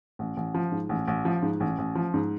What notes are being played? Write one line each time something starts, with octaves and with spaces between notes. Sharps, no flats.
A1
A1
F3
G#2
A1
A1
F3
G#2
A1
A1
F3
G#2